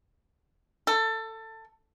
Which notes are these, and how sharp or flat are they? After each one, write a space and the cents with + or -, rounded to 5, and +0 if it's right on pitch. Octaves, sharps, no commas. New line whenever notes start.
A4 +20